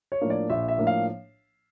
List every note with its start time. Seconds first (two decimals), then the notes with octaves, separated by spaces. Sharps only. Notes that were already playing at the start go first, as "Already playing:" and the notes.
0.12 C#5
0.21 A2 F3 A#3 D4
0.30 D5
0.50 A#1 E5
0.68 E5
0.78 A2 F3 A#3 D4
0.87 F5